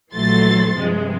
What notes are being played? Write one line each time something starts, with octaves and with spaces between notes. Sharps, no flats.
A#1 E3 F#3 A3 C6 A6
G2 C3 F3 G#3